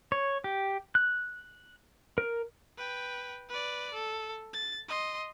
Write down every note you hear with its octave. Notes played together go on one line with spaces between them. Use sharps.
C#5
G4
F#6
A#4
B4 G5
B4 D5
A4
A6
D#5 C6